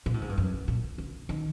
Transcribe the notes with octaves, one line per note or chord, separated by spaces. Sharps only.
A#2
A2
G#2
G2
F#2
A#2
D3
D#3